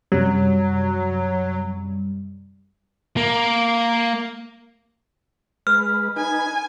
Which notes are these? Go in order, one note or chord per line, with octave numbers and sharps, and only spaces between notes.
F#2 C3 F#3 G3
A#3
G#3 B4 F6
D#4 B4 G#5